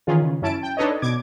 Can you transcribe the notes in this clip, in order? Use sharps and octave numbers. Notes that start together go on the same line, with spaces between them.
D#3 E3 C#4 F4 G#4
C#3
F#2 C#4 E4 A5 D7
G5
D4 D#4 A4 B4 C#5 D#5
B2 D6 G#6